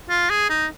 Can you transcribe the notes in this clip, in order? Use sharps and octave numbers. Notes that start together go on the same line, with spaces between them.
F4
G#4
D#4